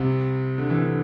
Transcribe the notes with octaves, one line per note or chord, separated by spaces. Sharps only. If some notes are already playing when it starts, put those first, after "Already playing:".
Already playing: C2 C3
D3
E3
D3